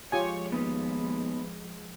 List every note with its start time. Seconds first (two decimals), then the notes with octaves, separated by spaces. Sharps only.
0.12 F3 G#3 F4 G4 C#5 G#5
0.52 D#2 B3 D#4 B4